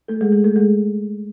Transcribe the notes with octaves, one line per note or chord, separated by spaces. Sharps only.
A3 A4
G#3 G#4
G#3 G#4
A3 A4
G#3 G#4